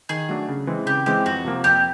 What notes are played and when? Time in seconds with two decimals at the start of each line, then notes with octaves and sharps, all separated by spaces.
0.09 D#3 G#4
0.29 F#3 A3 D4
0.48 C#3
0.67 E3 G#3 C4
0.86 C#3 G4
1.06 E3 G#3 C4 G4
1.26 F2 F#4
1.44 C3 F3 A#3
1.64 F2 G4